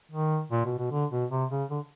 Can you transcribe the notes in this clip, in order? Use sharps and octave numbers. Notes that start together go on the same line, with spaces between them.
D#3
A#2
B2
B2
D3
B2
C3
C#3
D3